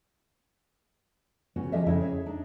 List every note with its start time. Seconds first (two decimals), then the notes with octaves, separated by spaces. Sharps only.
1.56 C#3 B3 C#4 F#4
1.72 F3 F#3 G4 G#4 D#5 E5
1.86 F2 C#3 E4 E5
2.00 G#4 C#5 E5
2.26 D4 D#4